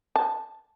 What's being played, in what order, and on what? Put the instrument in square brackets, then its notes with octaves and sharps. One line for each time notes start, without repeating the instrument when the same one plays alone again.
[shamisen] A5